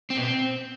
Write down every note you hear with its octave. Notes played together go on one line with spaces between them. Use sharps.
C4
B2
C4